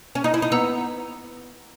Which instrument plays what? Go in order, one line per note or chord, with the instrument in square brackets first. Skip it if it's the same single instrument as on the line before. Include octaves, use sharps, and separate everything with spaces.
[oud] C#4
D#4
E4
D#4
[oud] B3 [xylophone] F#5 A#5 E6